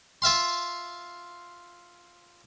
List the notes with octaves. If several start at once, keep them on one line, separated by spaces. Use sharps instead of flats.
F4 E5 F5 C6